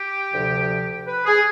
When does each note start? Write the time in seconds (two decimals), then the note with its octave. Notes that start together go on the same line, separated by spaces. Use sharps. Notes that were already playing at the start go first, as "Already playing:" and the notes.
Already playing: G4
0.31 D2 C3 F3
1.07 B4
1.26 G#4